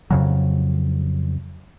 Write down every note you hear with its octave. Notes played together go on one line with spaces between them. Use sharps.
F2 C#3 F#3